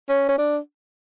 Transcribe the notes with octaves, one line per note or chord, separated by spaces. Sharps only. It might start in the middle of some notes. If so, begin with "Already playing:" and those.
C#4
C#4
D4